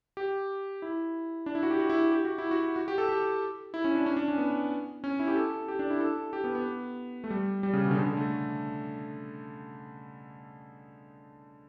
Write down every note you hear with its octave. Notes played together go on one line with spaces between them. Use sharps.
G4
E4
D4
E4
F#4
G4
F#4
E4
G4
F#4
E4
F#4
F#4
G4
A4
G4
E4
C#4
D4
C#4
D4
C#4
B3
C#4
E4
G4
A4
G4
D4
E4
A4
G4
B3
B3
A3
G3
G3
C#3
B2
D3
C#3
D3
A3